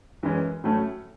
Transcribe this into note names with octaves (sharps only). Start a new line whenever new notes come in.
F#2 E3 G#3 C#4
A2 F#3 A3 C#4